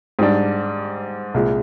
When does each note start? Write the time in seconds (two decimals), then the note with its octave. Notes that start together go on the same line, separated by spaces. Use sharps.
0.19 G#2 G3 D4
1.34 C2 A#2 G#3